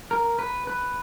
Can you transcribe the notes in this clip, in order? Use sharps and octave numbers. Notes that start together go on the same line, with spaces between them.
A#4
B4
B4